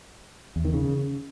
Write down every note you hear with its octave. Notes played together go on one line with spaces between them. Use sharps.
E2
D#3
C#3